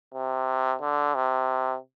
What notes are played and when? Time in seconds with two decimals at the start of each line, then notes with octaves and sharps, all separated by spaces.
0.14 C3
0.81 D3
1.15 C3